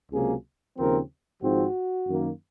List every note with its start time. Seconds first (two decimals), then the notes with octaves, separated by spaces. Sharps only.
0.11 C#2 C3 F#3 A#3 G#4
0.77 D#2 C#3 F3 C4 A#4
1.41 G#1 G#2 F3 C4 F#4
2.07 F#2 D#3 A#3